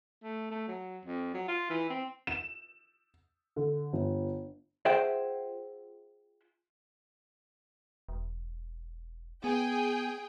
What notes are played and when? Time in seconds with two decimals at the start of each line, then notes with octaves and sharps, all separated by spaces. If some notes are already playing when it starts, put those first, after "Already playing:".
0.23 A3
0.51 A3
0.68 F#3
1.05 F2
1.34 F#3
1.48 F4
1.70 E3
1.89 C4
2.27 E7
3.56 D3
3.93 G1
4.85 F4 G#4 C5 E5 F#5 G5
8.09 E1
9.44 B3 G#4 G5